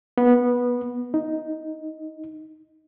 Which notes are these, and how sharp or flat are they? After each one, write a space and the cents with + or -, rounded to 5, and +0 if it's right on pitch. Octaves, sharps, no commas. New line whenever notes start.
B3 -15
D#4 +5